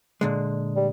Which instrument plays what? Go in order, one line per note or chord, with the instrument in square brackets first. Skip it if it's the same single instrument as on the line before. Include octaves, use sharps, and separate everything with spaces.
[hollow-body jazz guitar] A#2 D3 G#3
[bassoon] G3